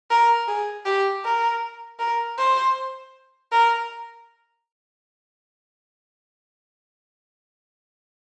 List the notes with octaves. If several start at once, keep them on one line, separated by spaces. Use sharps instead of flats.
A#4
G#4
G4
A#4
A#4
C5
A#4